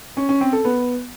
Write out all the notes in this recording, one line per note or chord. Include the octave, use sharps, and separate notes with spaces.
C#4
C#4
C4
A4
B3